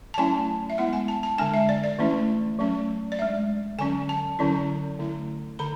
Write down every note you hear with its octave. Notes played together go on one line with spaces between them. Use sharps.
A5
F#3 A3 C#4 E4 G#5
E5
G#3 B3 E4 F#5
G#5
A5
A5
D3 G#3 D4 G#5
E5
D5
D5
E3 A3 C#4 E4
F#3 A3 C#4
D5
G#3 D4 E5
D3 F#3 C#4 G#5
A5
D3 F#3 C#4 E4
D3 A3 E4
D3 B5